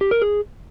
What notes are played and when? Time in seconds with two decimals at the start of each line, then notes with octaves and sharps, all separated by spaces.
0.01 G4
0.11 A#4
0.22 G#4